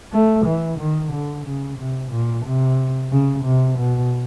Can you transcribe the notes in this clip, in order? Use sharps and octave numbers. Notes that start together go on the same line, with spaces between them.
A3
E3
D#3
D3
C#3
C3
A#2
C3
C#3
C3
B2